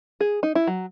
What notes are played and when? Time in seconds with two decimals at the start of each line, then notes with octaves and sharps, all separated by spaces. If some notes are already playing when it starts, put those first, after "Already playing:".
0.20 G#4
0.43 D#4
0.55 E4
0.67 F#3